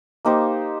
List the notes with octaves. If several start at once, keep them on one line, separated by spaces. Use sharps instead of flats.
A#3 D#4 G4 C5